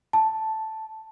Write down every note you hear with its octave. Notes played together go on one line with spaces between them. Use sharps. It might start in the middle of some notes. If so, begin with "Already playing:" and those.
A5